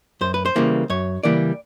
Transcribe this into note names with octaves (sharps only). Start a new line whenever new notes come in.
F#2 C5
B4
C5
C#3 E3 G3 A#3
F#2 C#5
C#3 E3 G3 A#3 D5